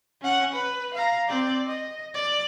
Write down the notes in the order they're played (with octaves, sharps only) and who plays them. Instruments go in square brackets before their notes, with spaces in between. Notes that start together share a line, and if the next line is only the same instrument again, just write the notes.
[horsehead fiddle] C#4 F#5
B4
F5 A#5
C4 D5
D#5
D5